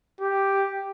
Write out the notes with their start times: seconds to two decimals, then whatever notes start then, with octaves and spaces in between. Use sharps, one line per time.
0.21 G4